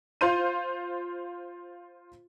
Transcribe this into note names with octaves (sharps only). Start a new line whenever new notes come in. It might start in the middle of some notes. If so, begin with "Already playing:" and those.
F4 C5 F5 C6 G6 D#7